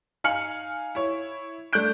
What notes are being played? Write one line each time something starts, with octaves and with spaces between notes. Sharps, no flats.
D#4 F5 G#5 F6 C#7 F#7
E4 C#5
A3 D4 F#6 G6 D7